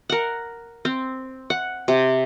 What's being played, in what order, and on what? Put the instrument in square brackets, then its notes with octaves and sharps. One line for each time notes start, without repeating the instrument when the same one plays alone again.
[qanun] A#4 F#5
C4
F#5
C3